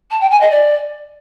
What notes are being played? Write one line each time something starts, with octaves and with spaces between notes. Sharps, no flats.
A5
G5
G#5
D#5
D5